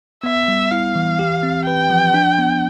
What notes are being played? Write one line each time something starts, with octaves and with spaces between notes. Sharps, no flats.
B3 E5
G3
E4 F5
E3
G4
C4
B4 G5
F3
D4
B3